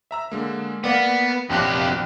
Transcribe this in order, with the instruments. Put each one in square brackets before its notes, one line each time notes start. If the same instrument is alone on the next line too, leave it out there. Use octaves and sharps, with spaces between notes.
[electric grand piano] E5 A#5 E6
D3 G#3 A#3
[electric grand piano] A#3 D5 F5 [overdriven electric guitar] B3
[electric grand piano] A#1 F#6 [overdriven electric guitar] F2 G4